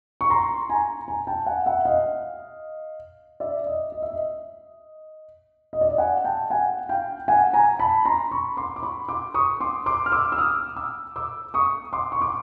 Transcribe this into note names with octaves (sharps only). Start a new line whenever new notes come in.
C#6
A#5 C6
G#5 A#5
G#5 A#5
G5 A5
F#5 G#5
E5 F#5
D#5 F5
D5 E5
D#5
D#5
E5
D#5
D#5
D5
D#5
F#5 G#5
G5 A5
F#5 G#5
F5 G5
F#5 G#5
G#5 A#5
A5 B5
A#5 C6
B5 C#6
C6 D6
D6
B5 C#6
C6 D6
C#6 D#6
C6 D6
C6 D6
F6
D6 E6
E6
D#6 F6
D6 E6
D6 E6
C#6 D#6
C6 D6
C#6
D6